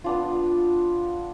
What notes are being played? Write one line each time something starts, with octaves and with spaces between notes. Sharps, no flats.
B3 D4 F4